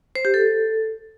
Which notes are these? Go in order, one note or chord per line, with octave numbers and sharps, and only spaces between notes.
C5
G4
A4